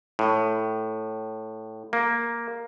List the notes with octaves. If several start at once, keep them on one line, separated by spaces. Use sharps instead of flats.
A2
A#3